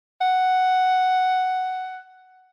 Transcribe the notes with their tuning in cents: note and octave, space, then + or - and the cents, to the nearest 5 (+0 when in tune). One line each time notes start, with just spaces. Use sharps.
F#5 +5